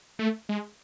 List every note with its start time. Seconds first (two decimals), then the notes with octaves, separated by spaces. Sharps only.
0.19 A3
0.49 G#3